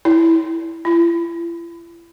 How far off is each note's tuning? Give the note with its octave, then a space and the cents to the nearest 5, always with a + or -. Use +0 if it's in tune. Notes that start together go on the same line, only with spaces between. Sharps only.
E4 -10
E4 +40